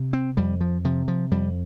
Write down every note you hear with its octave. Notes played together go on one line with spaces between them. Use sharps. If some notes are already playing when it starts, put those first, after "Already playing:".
Already playing: C3
C4
F2 G3
F3
C3 F3
F3
F2 G3